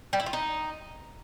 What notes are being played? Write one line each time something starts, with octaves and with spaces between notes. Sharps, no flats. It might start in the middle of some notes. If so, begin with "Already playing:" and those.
G3
E4
F4
D#4